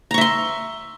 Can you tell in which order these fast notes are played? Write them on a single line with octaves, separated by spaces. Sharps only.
A#5 C#6 E5 C6